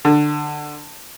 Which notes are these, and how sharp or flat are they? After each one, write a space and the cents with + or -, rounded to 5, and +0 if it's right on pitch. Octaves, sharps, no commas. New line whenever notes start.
D3 +15